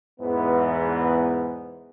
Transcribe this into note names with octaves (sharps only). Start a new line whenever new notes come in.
E2 G#2 E3 B3